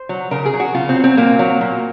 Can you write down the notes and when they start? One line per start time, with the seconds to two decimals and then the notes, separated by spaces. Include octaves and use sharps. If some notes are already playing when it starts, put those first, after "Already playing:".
Already playing: C5
0.09 F#3
0.31 C#3 A#4
0.46 G#4
0.53 F#3
0.60 F#4
0.75 C#3 F4
0.89 C4
0.95 F#3
1.04 C4
1.17 A#2 A#3
1.39 F#3
1.61 A#2